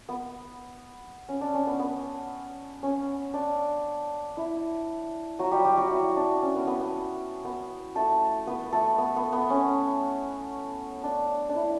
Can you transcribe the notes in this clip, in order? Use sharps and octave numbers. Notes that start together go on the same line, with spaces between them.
B3
C#4
D4
C#4
B3
B3
C#4
D4
E4
F#3 F#4
G3 G4
G3 G4
F#3 F#4
E4
D4
C#4
B3
B3
B3
B3
A3 A4
B3 B4
A3 A4
B3
B3
B3
C#4
D4
D4
E4